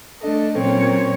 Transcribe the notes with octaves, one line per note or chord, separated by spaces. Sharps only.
A3 D4 A4 D#5
A#2 F#3 C4 C#4 C#5